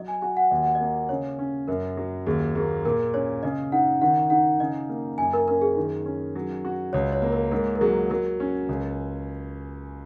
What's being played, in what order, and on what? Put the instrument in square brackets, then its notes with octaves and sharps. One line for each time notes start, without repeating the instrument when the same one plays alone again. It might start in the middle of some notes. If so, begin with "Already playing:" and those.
Already playing: [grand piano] F#3 [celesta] D#5
[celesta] G#5
[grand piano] F#4 [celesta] G#5
[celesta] F#5
[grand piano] D#2 [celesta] D#5
[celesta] F#5
D#5
[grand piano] A#3
[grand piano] C#3 [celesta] C#5
[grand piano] C#4
[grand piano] F#2 [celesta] A#4
[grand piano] F#3
[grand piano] D#2 [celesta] G#4
[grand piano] A#3 [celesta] G#4
[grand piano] A#2 [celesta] A#4
[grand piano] C#4 [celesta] C#5
[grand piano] C#3 [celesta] D#5
[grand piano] D#4 [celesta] F#5
[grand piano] D#3 [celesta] F#5
[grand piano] D#4 [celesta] F#5
[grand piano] C#3 [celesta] D#5
[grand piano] A#3
[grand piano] F#2 [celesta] G#5
[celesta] A#4
[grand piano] C#4 [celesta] A#4
[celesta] G#4
[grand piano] D#3
C#4
F#3
F#4
[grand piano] C#2 [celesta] C#5
[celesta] C#5
[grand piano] A#3
[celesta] A#4
[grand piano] G#2 [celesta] A#4
[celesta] A#4
[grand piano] F#3 [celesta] G#4
[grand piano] F#3 [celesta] A#4
[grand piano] C#4
C#2